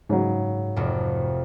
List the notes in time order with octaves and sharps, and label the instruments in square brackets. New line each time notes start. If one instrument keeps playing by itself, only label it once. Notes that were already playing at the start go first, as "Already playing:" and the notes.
[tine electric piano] G#2 [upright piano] C#3 F#3
[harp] F1 F2